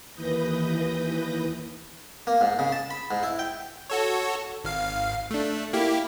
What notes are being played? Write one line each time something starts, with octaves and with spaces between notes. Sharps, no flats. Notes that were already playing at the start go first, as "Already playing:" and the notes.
D#2 E3 B4 D#6 G6 A#6
A#3
G#2
C#3
A5
B5
G#2
E4
G5
F#4 A4 C#5
G#1 F5
A3 D4
A#3 E4 G4